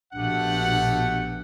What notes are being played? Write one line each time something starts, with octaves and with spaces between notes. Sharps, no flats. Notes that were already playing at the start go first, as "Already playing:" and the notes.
A#1 B2 A3 D4 G4 F#5